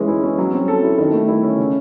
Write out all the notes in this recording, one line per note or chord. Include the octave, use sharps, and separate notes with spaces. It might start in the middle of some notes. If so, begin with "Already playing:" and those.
Already playing: E3 G#3 C#4
E4
C#4
F#3
C4
A4
E4
D#3
A3
E4
C#4
C#3